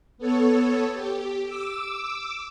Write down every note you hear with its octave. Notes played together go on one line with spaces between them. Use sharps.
B3 A4 C#5
G4
D6 E6